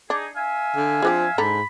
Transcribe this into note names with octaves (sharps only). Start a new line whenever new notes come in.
D4 D#4 G#4
E5 F5 G#5
D3
F3 C4 D4 G#4
G#2 D3 A4 A#5 B5